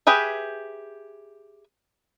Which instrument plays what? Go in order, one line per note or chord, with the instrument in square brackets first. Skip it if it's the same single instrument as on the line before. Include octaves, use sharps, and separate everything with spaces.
[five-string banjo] G4 G#4 B4 E5